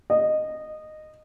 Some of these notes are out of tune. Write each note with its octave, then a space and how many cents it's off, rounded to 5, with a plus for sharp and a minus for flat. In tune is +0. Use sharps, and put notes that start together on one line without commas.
D#5 -15